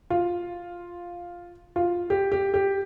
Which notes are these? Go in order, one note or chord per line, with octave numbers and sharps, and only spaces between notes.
F4
F4
G4
G4
G4